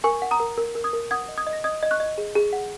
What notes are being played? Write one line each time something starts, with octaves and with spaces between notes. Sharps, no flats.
A#4 G#5 C#6
F#5
A#5 D#6
A#4
A#4
A#4
D#6 G#6
A#4
F#5 D#6 G#6
D#5
D#6 G#6
D#5
A#6
D#5 D#6 G#6
D#5
C#6 F#6
D#5
G#4
G#4
F#5